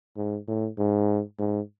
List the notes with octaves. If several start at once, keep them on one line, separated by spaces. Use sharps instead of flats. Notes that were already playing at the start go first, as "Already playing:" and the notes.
G#2
A2
G#2
G#2